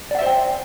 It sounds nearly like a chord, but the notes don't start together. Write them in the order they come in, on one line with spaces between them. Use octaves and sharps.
D5 F#5 E5 C5 G5